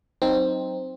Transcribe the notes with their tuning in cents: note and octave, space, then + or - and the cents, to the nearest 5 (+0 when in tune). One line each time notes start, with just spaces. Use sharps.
F#3 +15 C4 +0 D#4 +0